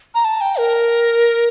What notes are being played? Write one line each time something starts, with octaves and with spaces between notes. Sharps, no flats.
A#5
A5
G5
A#4